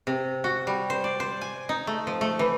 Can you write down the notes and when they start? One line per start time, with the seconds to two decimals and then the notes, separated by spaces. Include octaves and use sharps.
0.07 C3
0.44 F#4
0.67 G3
0.90 C5
1.04 D5
1.20 C5
1.41 G#5
1.69 D#4
1.87 A3
2.07 F3
2.21 A3
2.39 E3